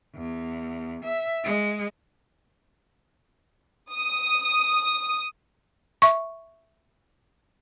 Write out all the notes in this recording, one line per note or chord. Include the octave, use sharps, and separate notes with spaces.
E2
E5
G#3
D#6
E5 C#6